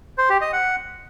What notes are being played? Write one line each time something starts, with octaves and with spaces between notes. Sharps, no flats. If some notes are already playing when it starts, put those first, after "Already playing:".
C5
G4
D#5
F#5